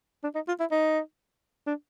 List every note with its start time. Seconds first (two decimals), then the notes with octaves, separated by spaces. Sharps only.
0.23 D4
0.35 D#4
0.48 F4
0.60 E4
0.71 D#4
1.67 D4